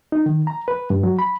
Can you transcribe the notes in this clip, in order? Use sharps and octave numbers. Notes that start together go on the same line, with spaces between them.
D#4
D#3
A#5
B4
G2
F#3
B5